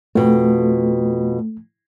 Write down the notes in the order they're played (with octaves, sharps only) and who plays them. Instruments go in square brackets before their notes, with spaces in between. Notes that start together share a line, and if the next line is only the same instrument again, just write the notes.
[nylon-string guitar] F2 B2 [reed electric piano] A3